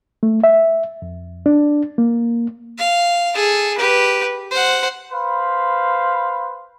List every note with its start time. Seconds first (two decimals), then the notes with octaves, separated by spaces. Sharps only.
0.23 A3
0.44 E5
1.02 F2
1.46 D4
1.98 A#3
2.78 F5
3.35 G#4 A4
3.78 G4 B4
4.51 C5 F#5
5.12 B4 C5 F5 B5